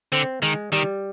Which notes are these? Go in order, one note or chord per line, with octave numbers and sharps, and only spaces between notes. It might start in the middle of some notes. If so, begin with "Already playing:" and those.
D3 C4
D#3 G#3
D#3 G3